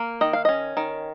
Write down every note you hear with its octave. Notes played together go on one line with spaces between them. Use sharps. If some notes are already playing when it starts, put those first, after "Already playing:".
Already playing: A#3
D#3 D#5
F5
C#4 D#5
D#3